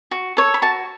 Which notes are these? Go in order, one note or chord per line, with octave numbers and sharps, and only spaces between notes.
F#4
A4 C#5
B5
F#4 A5